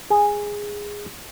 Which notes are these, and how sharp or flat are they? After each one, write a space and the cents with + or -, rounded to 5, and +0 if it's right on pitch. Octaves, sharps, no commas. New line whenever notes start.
G#4 -10